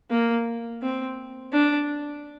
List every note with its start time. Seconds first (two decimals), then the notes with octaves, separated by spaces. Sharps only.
0.11 A#3
0.82 C4
1.53 D4